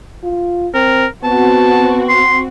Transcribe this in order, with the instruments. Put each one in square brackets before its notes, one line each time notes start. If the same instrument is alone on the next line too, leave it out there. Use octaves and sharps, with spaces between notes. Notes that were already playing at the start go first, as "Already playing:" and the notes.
[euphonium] F4
[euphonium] C4 [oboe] A#4
[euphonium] B3 [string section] C4 F#4 [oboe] A5
[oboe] C6